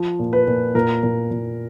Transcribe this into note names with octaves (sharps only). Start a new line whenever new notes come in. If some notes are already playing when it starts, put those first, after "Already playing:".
Already playing: F3
A#2
B4
A#2
A#2 A#4
A#2
A#2